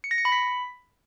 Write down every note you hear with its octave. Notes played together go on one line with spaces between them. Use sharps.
C#7
A#6
C#7
B5
B6